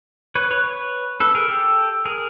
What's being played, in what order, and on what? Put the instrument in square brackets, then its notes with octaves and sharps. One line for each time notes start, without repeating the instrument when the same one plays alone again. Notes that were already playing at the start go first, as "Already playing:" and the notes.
[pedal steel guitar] B4 C#5
B4 C#5
B4 C#5
A4 B4
G#4 A#4
G4 A4
G#4 A#4